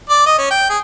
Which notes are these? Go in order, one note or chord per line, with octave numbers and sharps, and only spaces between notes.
D5
D#5
C#4
G5
G#4